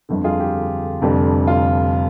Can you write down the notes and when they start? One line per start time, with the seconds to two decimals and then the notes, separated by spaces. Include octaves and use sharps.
0.09 G1 F2 D3
0.24 F4 G#4
0.40 G4
1.01 F1 F2 D3 G3
1.47 F4